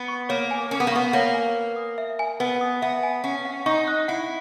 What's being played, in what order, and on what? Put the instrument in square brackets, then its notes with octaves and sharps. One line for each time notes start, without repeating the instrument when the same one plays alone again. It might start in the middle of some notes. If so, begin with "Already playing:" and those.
Already playing: [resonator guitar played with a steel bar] B3
[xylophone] C#6
[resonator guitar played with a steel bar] A#3 [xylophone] C#5
[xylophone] G#5
[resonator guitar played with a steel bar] C#4 [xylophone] A#4
[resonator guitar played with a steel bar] B3
A#3
[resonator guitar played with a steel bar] B3 [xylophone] C#6
[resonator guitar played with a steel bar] A#3 [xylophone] C#5
[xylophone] G#5
B4
D#6
E5
G#5
[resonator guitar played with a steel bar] B3 [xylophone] B4
[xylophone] D#6
[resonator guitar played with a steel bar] B3 [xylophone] E5
[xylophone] G#5
[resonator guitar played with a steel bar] C#4 [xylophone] F#5
[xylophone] F#5
[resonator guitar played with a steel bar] D#4 [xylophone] C#6
[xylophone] F#6
[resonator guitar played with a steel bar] E4 [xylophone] F#5